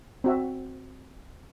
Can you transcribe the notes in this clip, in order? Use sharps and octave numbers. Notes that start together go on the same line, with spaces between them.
C4 F#4 E5